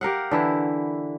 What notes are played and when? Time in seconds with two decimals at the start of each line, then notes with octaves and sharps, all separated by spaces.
0.01 G4 A#4 F5 F#5
0.31 D3 E3 E4